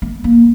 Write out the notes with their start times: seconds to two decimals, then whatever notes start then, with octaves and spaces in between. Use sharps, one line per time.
0.02 A3
0.24 A#3